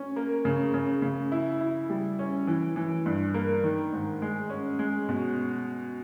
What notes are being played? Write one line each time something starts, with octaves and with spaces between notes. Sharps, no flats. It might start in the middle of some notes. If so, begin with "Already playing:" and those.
Already playing: C#4
A#3
C#3
C#3
C#3
E4
E4
G3
C#4
E3
E3
G2
A#3
D#3
G#2
G#3
C#4
G#3
B2